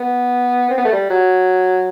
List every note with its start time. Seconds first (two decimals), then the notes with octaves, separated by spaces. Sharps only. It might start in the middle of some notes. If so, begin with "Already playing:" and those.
Already playing: B3
0.70 C4
0.77 B3
0.85 A3
0.92 G3
1.10 F#3